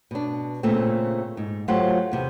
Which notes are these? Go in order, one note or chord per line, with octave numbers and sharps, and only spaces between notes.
B2 D4
A#2 C#3 A3 C4
G#2
F#3 A3 F4 G4 C5 F#5
E2 C3